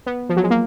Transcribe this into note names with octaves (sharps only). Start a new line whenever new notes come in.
B3
F3
F#3
G#3
A#3